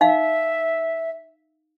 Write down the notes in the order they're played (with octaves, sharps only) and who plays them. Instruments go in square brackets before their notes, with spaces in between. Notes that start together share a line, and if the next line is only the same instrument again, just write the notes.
[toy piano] D#4 F5 [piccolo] E5